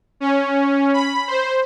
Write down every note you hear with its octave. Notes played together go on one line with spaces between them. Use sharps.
C#4
B5
C5